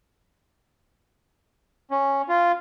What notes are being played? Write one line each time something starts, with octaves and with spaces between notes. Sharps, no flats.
C#4
F4